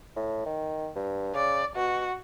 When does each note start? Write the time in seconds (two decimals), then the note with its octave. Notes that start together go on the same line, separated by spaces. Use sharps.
0.16 A2
0.46 D#3
0.96 G2
1.35 C#3 D5
1.76 B2 F#4